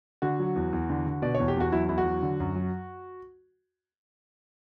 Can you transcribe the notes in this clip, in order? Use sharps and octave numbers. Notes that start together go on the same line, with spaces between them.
D3 F#4
F#3
E2
E2
D3
D3
B2 D5
C#5
E2
G4
E2 F#4
F#3 E4
E2 E4
F#4
F#3
D3
F#2
F#3